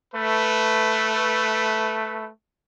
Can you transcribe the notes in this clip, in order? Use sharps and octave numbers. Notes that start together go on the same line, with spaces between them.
A3 B4